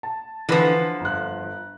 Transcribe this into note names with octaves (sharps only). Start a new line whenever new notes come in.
A5
D3 E3 F3 B4
G1 F#6